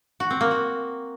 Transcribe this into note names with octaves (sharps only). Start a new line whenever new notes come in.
F#4
C4
A#3
F#4